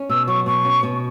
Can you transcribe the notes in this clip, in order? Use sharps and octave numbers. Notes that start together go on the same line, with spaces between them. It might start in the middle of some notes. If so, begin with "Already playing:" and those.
Already playing: C#4
B2 E6
F#3 C#6
B2 C#6
C#4
B2